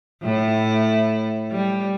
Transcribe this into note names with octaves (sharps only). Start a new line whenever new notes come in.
A2 E4
G3